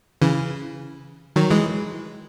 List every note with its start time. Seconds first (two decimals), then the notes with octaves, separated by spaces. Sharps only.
0.22 C#3 E3
1.36 D#3 F#3
1.50 E3 G#3